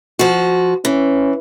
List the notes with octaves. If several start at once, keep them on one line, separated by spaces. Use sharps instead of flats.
F3 F#4
E3 C#4